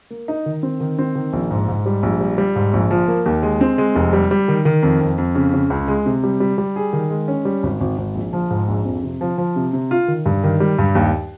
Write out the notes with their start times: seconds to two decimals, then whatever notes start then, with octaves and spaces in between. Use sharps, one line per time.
0.10 A#3
0.28 D#4
0.46 D#3
0.63 C4
0.80 D#3
0.99 C4
1.15 D#3
1.33 A#1
1.51 G#2
1.68 G#2
1.86 G3
2.03 A#1
2.21 G3
2.38 G3
2.56 G#2
2.73 A#1
2.91 F3
3.08 A#3
3.26 D#2
3.43 G#3
3.61 C4
3.78 G#3
3.95 F1
4.13 G3
4.31 G3
4.48 D#3
4.65 D#3
4.83 F2
5.01 F2
5.18 F2
5.35 C#3
5.54 C#3
5.70 C#2
5.88 G#3
6.06 C3
6.23 G3
6.40 G3
6.58 G3
6.76 G#4
6.93 D#3
7.11 G#3
7.28 C#4
7.45 G3
7.63 G#1
7.81 G#1
7.98 G#1
8.15 A#1
8.33 F3
8.50 G#2
8.68 A#1
8.85 F2
9.03 C3
9.21 F3
9.38 F3
9.56 C3
9.73 C3
9.91 F4
10.08 D#3
10.26 G2
10.44 D#3
10.60 G3
10.79 G2
10.95 D#2